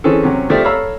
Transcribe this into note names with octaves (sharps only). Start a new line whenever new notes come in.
E3 C4 C#4 G#4 A4
C3 F#3 C#4
F3 A3 G4 D5 E5
A4 C#5 F5 A#5 B5 E6